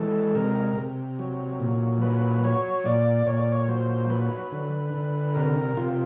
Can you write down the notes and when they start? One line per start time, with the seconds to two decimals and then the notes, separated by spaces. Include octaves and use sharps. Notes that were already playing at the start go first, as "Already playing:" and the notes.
Already playing: E3 G#3 A4
0.35 C3 A#4
0.77 C3
1.19 F#3
1.60 A#2
2.02 F#3 B4
2.44 F#3 C#5
2.85 A#2 D5
3.27 A#2 C#5
3.40 D5
3.52 C#5
3.68 F#3 C5
4.10 F#3 B4
4.52 D3
4.94 D3
5.35 C3 A#4
5.77 C3 F4